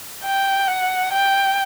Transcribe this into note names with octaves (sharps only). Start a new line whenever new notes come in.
G5
F#5
G5